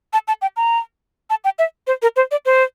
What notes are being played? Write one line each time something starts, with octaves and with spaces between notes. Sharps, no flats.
A5
A5
G5
A#5
A5
G5
E5
C5
A#4
C5
D5
C5